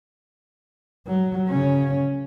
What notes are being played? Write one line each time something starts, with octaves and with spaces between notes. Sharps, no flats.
F#3
C#3 C#4